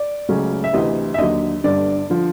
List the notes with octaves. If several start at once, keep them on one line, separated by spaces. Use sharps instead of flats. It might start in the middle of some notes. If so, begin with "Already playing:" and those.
Already playing: D5
C#2 C#3 F#3 A3 C#4
E5
D2 C3 E3 D#5
E5
D#2 D3 F#3 D#5
G1 G2 D3 D5
D3 F3